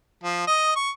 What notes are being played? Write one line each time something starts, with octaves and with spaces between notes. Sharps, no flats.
F3
D#5
C#6